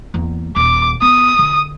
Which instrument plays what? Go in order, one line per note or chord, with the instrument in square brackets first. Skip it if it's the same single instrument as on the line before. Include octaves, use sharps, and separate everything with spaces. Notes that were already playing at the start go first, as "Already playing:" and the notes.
[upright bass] E2 A#3
[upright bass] D#1 [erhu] D6
[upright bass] B3 [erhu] D#6
[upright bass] D3